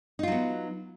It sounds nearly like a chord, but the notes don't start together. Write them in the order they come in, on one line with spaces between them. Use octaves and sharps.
D#4 F4 F#3 B3